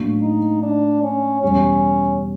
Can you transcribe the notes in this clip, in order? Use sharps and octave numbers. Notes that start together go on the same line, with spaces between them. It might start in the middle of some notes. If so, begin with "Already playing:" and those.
Already playing: A2 F#3 A#3 D4
D#4
D4
C#4
E2 B2 G3 C#4